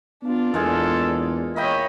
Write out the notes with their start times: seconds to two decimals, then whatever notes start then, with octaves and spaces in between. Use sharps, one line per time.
0.23 B3 D4 F4
0.54 E2 A#2 G#3 G#4 A4
1.56 A#3 C#5 D#5 E5 G5 B5